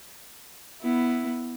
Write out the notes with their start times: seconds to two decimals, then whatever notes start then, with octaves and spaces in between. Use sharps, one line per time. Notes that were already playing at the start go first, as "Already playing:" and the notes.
0.82 B3 E4